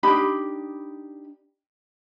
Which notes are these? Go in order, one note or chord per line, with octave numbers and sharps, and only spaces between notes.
D4 D#4 G4 B5